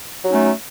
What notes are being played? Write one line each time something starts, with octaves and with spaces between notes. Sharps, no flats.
F#3 A3 C#4 D#4